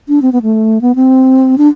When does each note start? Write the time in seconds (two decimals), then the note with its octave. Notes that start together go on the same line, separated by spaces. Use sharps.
0.09 D4
0.22 C4
0.32 B3
0.42 A3
0.81 B3
0.95 C4
1.58 D4